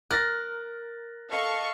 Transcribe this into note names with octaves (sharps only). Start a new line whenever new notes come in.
A#4 F#6 A6 A#6
A4 D#5 F5 C#6